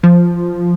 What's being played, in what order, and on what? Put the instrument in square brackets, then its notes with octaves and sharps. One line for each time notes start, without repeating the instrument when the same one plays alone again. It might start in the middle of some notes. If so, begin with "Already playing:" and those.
[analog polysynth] F3